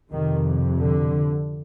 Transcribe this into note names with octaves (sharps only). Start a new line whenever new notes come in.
F2 C3 D#3
D3